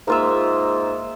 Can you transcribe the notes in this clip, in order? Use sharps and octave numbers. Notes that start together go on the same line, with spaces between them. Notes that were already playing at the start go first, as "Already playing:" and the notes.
G#2 A#3 F4 E5